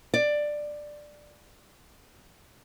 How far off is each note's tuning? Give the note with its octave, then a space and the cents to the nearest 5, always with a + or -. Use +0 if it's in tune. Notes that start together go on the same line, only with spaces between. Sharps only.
D5 +10